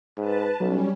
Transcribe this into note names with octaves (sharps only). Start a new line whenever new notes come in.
G#2 B4 A5
B1 F#3 G3 C#4